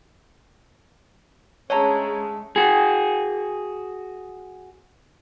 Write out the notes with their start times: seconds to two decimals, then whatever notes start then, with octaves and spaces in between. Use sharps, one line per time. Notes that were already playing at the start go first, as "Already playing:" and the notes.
1.70 D3 G#3 A3 C#4 G#4 C#5 A5 A#5
2.56 F#4 G#4